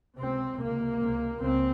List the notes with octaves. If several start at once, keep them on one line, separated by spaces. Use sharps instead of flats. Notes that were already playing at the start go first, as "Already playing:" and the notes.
C#2 C3 C4
C#2 C3 A#3
C#2 C3
C#2 C#3 C4